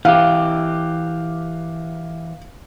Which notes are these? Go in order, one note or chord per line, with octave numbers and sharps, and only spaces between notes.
E3 G4 F5